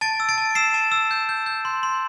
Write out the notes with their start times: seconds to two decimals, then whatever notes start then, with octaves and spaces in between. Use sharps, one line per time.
0.01 A5 A6 D7
0.20 E6
0.29 A6 D7
0.38 A5
0.55 E6 C7 E7
0.74 A5
0.92 E6
1.11 G6
1.29 G6
1.46 G6
1.65 C6
1.83 C6